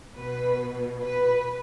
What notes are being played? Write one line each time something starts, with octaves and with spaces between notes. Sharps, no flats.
B2 B4
B4